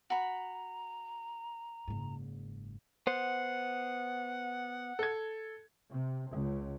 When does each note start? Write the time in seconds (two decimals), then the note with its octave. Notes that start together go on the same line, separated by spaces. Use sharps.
0.10 F#4 A#5 B5
1.88 F#1 G#2
3.07 B3 C5 F#5
4.99 A4 G#6
5.88 C3
6.31 C#2